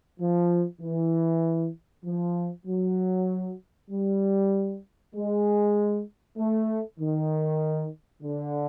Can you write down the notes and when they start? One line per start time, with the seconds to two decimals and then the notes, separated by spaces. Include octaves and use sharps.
0.20 F3
0.81 E3
2.05 F3
2.66 F#3
3.90 G3
5.15 G#3
6.38 A3
7.00 D#3
8.23 D3